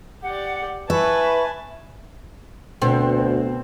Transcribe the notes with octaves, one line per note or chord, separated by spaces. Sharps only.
G4 D5 F#5
E4 B4 E5 G#5 A5 B5 C#6
D2 B2 C4